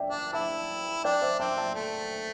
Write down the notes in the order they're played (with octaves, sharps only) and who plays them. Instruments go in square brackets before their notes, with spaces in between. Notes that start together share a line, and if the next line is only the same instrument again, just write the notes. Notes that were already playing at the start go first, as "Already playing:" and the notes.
Already playing: [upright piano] D5 E5 G5
[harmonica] D4
[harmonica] E4 [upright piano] E5 A5
[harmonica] D4 [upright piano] D5 G5
[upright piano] C5 E5
[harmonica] C4 [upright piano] E5 A5
[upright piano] E5 A5
[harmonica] A3